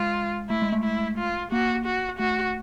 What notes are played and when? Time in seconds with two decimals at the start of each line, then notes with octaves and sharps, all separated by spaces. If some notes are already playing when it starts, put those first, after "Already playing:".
Already playing: G#3 F4
0.50 A3 E4
0.62 G#3
0.72 A3
0.84 E4
1.18 F4
1.52 A#3 F#4
1.85 F#4
2.19 A3 F#4